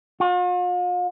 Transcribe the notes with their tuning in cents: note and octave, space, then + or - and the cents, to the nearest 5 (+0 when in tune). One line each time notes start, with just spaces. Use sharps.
F4 +45